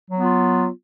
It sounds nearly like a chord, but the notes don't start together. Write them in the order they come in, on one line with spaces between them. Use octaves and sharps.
F#3 B3 F4